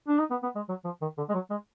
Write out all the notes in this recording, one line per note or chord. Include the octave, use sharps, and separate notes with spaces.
D4
D#4
B3
B3
G#3
F#3
F3
D#3
D3
G#3
F#3
G#3